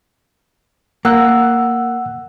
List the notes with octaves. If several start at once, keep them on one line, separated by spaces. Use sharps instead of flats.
A#3 F#5 E6 F#6